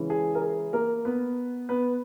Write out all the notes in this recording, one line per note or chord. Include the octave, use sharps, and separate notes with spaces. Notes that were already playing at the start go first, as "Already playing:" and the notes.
Already playing: C#3 E3 G#3 C#4 E4
G#4
A#4
G#4
A#3 A#4
B3 B4
B3 B4